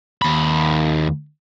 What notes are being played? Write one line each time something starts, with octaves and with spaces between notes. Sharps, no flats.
D#2 B5